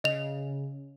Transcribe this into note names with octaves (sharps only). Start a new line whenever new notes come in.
C#3 D#5 F7